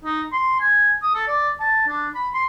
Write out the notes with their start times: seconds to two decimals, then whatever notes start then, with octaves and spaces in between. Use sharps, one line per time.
0.04 D#4
0.32 C6
0.60 G#5
1.02 D#6
1.14 A4
1.27 D5
1.60 A5
1.87 D4
2.15 B5
2.34 C6